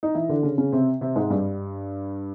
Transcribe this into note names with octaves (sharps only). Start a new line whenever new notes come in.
D#4
E3 E4
D3 D4
C#3 C#4
C#3 C#4
C3 C4
C3 C4
G#2 G#3
G2 G3